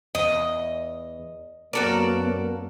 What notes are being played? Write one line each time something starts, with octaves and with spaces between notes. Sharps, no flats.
E2 D#5
F#2 A#3 B3 F#4 A4 A#4 D5